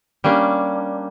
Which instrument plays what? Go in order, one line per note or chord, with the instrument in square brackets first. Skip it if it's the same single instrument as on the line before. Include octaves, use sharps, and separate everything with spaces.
[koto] G3 A#3 C#4 D4